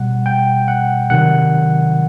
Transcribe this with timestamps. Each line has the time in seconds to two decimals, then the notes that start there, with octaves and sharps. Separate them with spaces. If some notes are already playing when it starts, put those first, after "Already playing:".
Already playing: B2 G3 F#5
0.26 G5
0.68 F#5
1.10 C3 D#3 F#3 F#5